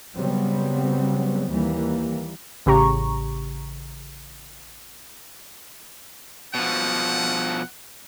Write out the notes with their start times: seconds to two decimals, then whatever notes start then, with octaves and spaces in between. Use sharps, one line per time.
0.15 C#3 F#3 G3 B3 C4
1.49 D#2 E3 G3 A#3
2.66 A1 C#3 G4 A#5 C#6
6.55 B2 F3 F#5